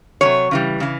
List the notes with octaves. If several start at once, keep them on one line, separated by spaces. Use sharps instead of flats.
C3 D#3 F#3 C#5
C#3 E3 G3
C#3 E3